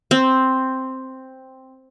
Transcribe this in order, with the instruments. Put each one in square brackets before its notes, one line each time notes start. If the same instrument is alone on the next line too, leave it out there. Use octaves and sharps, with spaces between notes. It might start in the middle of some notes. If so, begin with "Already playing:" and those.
[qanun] C4